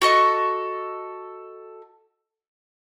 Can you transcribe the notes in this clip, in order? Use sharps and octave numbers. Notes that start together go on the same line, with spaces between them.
F#4 A4 D#5 C#6